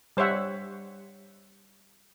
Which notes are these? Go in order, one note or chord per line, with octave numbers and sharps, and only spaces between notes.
G3 C5 C#5 E5 F#5